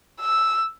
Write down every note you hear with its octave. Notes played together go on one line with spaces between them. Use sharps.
E6